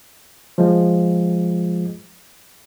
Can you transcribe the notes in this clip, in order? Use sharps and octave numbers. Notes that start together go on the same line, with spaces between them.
F3 G#3